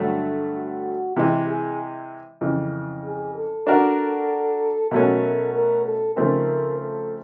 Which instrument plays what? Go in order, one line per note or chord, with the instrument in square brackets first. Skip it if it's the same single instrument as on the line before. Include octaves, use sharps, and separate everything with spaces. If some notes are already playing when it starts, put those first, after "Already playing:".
Already playing: [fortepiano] G2 D3 F#3 A3
[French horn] F#4
[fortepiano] C3 E3 G#3 [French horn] G4
[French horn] G#4
[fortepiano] F2 C#3 E3
[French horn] G#4
A4
[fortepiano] A#3 D4 F#4 A#4 D5
[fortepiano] B2 F#3 A3 C#4 [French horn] A#4
[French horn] A#4
A4
[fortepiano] C#3 F3 A3 C4 D#4 [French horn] A#4
[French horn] A4